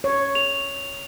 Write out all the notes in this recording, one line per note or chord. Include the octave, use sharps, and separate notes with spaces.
C#5
F7